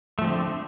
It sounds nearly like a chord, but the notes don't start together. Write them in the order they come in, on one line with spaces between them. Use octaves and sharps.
A3 F3 C4 D3